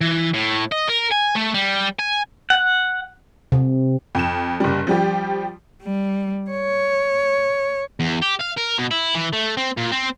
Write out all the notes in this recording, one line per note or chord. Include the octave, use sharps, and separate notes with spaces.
E3
A2
D#5
A#4
G#5
A3
G3
G#5
F#5
C3
F2 E7
F#1 G3
F3 G3 G4
G3
C#5
E2
G4
F5
A#4
B2
E4
E3
A3
C4
A#2
C4